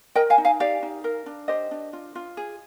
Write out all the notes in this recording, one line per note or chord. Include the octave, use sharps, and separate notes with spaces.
A#4 D#5 G5
F5 G#5
D#4
F5 G#5
G4 D5 F5
D#4
A#4
D4
G4 C5 D#5
D4
F4
F4
G#4